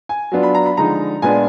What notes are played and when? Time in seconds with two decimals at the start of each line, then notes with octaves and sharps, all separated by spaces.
0.09 G#5
0.32 F#3 B3 D4 F4
0.43 B5
0.55 A#5
0.66 B5
0.77 D3 F3 G#3 D#4 A#5
1.22 A#2 G#3 B3 D4 F4 G#5